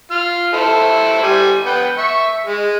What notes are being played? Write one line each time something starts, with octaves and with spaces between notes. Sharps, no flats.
F4 F6
E4 A4 C5
G3 G#5
B3 G5
E5 C#6
G#3